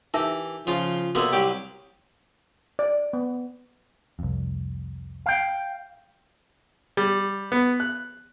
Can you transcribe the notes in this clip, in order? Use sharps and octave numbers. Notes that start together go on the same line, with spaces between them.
E3 D#4 G4 A#4 E5
C#3 F3 F4
C3 A#3 B3 F#4 A#4 D5
C2 F#3 G4 D6
D5
B3
C2 F2
F5 G5
G3
B3
F#6